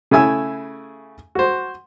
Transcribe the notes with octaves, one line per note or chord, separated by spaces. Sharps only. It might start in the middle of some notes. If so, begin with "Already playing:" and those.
C#3 A3 E4 G#5 E6
F#4 C5